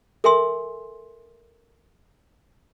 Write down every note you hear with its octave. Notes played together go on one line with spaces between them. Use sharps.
A4 A#4 E5 G#5 C6 E6